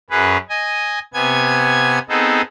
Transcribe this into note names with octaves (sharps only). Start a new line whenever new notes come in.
F#2 C#4 G#4 B4
D#5 G#5
C3 B3 G#5 G#6
B3 C4 D#4 G#4 A4